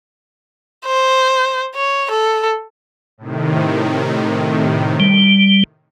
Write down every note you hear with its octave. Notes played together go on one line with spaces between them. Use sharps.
C5
C#5
A4
A2 C3 D#3
G3